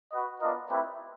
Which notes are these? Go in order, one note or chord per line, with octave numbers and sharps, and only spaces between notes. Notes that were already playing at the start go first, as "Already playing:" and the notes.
F#4 B4 D#5
B3 D4 F4 A#4 D#5
A3 C4 E4 G4 B4